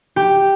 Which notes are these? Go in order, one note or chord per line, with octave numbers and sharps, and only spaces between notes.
G4